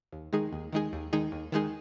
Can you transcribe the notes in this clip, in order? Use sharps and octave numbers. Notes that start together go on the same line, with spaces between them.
D#2
D#3 G#3 D#4 G#4
D#2
D#3 G#3 D#4 G#4
D#2
D#3 G#3 D#4 G#4
D#2
D#3 G#3 D#4 G#4